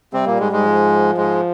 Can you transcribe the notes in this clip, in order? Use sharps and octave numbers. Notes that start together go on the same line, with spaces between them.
C3 G3 C4
A#2 A#3
G#2 G#3
G#2 G#3
F3
G#2 G#3